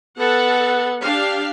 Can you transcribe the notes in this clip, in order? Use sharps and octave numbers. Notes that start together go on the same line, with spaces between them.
B3 A4 F#5
D4 G4 F5